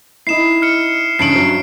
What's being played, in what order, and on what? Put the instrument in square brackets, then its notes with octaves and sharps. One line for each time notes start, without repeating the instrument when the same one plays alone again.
[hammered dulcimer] D#4 E4 [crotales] C7 E7
[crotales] F6 C#7
[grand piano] G2 C#3 F#7 [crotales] C7 D7
[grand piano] G2 F#3